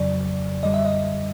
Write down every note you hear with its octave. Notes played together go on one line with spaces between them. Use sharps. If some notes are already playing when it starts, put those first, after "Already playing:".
Already playing: F2 C#3 F#3 D5
F#2 D3 G3 D#5
E5
D#5